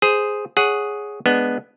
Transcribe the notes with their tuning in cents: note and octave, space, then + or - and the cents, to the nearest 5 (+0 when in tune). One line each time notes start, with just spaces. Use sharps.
G#4 +0 C5 -5
G#4 +0 C#5 +0 F#5 +0
G#3 +0 B3 +0 D4 +0